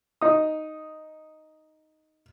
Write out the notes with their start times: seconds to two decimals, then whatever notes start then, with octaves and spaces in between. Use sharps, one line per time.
0.21 D#4 D#6